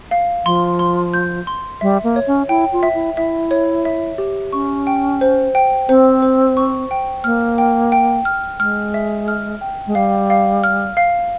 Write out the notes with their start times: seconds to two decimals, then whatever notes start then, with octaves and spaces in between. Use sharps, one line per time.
0.11 F5
0.45 F3 C6
0.79 C6
1.14 G6
1.47 C6
1.81 G3 E5
2.04 A#3
2.16 C#5
2.27 C#4
2.49 E4 G5
2.73 F4
2.83 E5
2.94 E4
3.17 E4 E5
3.51 C#5
3.85 E5
4.18 G4
4.53 C#4 C#6
4.87 G5
5.21 C5
5.55 G5
5.89 C4 C5
6.22 C5
6.57 C#6
6.91 G5
7.24 A#3 F6
7.58 G5
7.92 G5
8.25 F6
8.60 G#3 F6
8.94 E5
9.28 F6
9.61 G5
9.87 G#3
9.95 G3 F5
10.30 F5
10.64 F6
10.97 F5